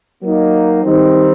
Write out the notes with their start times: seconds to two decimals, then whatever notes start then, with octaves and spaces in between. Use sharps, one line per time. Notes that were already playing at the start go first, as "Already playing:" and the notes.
0.21 F#3 A#3 D#4
0.83 D#3 G3 C4 D#4